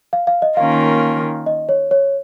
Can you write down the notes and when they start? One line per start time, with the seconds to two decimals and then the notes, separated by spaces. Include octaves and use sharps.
0.13 F5
0.27 F5
0.42 D#5
0.57 D#3 A#3 C#4 F4 A#4 F5
1.46 D#5
1.69 C#5
1.91 C#5